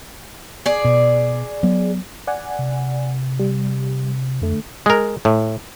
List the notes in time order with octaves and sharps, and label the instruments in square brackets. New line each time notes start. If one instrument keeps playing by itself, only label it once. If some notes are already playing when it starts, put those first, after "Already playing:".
[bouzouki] G#4 D5
[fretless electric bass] B2
F#3 B3
[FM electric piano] D5 F#5 G#5
[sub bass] C3
[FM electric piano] G3
[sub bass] F2 [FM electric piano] D3 A3
[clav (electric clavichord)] G#3 A#4
A2